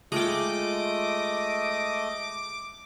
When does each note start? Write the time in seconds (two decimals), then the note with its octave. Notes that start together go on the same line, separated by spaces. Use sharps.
0.12 G#3 A3 F4 D#5 G5 D6 D#6